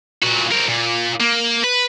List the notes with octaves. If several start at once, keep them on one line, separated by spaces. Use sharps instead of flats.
A#2 F#4
C4 A#4
A#2
A#3
B4